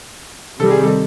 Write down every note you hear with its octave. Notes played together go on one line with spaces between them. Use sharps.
C3 D#3 G3 A4
G#4
A4